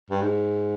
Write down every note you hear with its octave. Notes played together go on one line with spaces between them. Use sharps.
G2
G#2